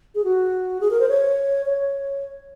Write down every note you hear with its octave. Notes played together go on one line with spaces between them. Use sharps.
G#4
F#4
G#4
A#4
C5
C#5
C#5